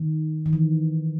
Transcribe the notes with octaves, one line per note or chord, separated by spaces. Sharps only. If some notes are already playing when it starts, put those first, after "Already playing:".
Already playing: D#3
D#3
E3